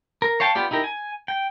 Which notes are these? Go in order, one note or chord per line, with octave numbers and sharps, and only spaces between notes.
A#4
C#5 F5 G5 A5
B3 F4 G4 D5
D#4 E4 G4 A#4
G#5
G5